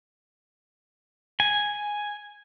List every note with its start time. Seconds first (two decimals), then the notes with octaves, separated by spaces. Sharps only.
1.40 G#5